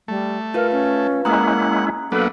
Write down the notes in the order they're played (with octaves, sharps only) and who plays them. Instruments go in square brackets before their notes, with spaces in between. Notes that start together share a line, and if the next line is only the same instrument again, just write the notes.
[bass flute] G3 [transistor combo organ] A3
[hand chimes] F4 B4 F5 [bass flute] A#4
[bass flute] C#4
[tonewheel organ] G#3 C#4 E4 [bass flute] A#3 [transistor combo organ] F#5 [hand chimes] A#5 D#6 F#6
[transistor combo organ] F#3 B3 D4 [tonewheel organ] A#3 B4 [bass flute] A4